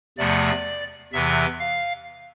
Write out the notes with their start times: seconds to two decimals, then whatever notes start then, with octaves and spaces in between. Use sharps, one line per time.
0.18 E2 C3 F3 A3 D5
1.13 E2 C3 E3 E5
1.60 F5